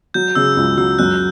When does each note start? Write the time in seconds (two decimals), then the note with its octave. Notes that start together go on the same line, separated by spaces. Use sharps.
0.14 F#3 G6
0.35 C#3 E6
0.57 C#2
0.77 F#3 E6
0.99 F#2 F#6